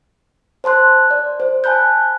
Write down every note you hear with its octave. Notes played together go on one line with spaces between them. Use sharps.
C5 A5 C6 F#6
D5
C5
G#5 A5 B5 F#6 G6